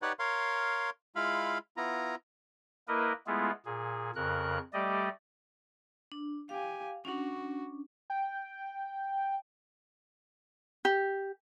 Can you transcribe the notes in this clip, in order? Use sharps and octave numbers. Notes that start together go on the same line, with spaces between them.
D#4 G4 B4 C#5 D5 F#5
A#4 C#5 F5 C6
G#3 E4 F4 F5 B5
B3 E4 F4 A#5
A#3 E4 A#4 B4 D#5
G#3 A3 B3 E4 F4 G#4
A#2 G#4
F2 C#3 A#4 F#6
G3 A3 G4 D5 D#5
D4
G4 F5 G#5
C#4 D4 F#4
G5
G4